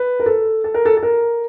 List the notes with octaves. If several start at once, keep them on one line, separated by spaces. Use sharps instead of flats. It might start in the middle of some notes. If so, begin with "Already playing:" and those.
Already playing: B4
A#4
A4
A4
A#4
A4
A4
A#4